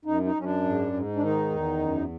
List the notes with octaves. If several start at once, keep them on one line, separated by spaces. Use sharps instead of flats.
F#2 D#4
D#4
F#2 C#4
D4
G#2
G#2
D4
D#3 D#4
E2
F#2